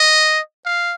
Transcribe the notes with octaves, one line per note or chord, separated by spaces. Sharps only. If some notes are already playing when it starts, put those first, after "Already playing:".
Already playing: D#5
F5